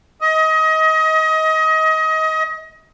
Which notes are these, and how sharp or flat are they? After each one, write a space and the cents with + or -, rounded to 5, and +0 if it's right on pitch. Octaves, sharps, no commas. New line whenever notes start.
D#5 +25